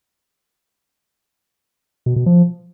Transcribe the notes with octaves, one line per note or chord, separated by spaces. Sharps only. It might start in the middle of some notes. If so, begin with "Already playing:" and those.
B2
B2
F3